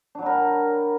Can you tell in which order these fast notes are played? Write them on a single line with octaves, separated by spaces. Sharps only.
D4 F#3 G3 A#4